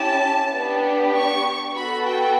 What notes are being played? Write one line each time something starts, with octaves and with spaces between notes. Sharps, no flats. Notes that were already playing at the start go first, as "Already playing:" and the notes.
Already playing: C#4 E4 G4 A5
B3 D4 G4
C#6
B3 F#4 A4 B5
G5